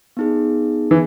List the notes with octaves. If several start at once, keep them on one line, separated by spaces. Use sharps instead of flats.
B3 D#4 G#4
E3